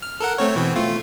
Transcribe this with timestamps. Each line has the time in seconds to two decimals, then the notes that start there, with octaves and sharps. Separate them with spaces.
0.02 F6
0.20 A4 A#4 F#5
0.38 A3 C4 C#5
0.55 B2 E3 C4
0.76 A3 F4